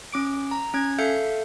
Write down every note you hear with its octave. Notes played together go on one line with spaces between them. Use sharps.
C#4 D6 D7
A#5
C#4 G#6
A4 E5 F5 G6 C#7